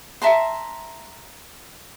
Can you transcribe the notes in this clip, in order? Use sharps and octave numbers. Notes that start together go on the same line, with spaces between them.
E5 A5 A#5 C6